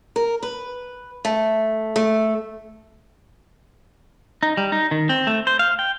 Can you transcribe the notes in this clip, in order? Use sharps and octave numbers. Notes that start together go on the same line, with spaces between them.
A#4
B4
A3
A3
D#4
G3
D#4
D#3
C4
A3
C5
F5
G5